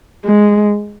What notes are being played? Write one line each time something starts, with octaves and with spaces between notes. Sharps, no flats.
G#3